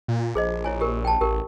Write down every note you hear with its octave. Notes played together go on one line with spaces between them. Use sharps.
A#2
A#1 G#4 C5 D#5
E4 C#5 G#5
G4 A#4
G5 A5
A1 G4 A#4